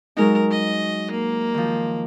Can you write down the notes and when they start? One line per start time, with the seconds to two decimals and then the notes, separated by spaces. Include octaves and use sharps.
0.17 F#3 G#3 D#4 A#4
0.51 D#5
1.11 A#3
1.54 D#3 F3